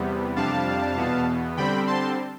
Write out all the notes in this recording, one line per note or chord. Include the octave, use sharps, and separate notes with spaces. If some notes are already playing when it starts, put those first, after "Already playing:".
Already playing: E2 C3 G3 B3
F2 C3 G3 D4 F5 A5
E2 B2 B3
D3 G3 C4 G5 B5
A5 C6